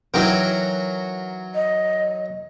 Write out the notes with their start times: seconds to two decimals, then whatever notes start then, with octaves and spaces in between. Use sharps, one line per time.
0.14 E3 F#3 D#4 F#4 A#4 G5
1.55 D#5